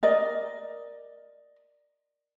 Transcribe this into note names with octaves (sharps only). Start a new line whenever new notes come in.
A#4 D5 D#5